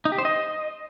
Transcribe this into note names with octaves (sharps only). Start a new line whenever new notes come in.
D#4
G4
C5
D#5